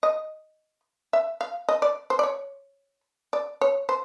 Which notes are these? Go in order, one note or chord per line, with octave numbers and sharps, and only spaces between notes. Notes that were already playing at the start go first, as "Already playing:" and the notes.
D#5
E5
F5
D#5
D5
C5
D5
C#5
D5
C#5
C5